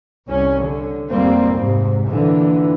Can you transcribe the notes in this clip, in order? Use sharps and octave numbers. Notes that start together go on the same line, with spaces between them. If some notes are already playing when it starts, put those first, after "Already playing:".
C2 C#4
D3
F1 G3 A#3 C4
G#2 C3
A#2 D3 E3